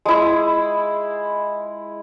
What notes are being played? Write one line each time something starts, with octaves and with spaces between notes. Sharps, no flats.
G#3 E4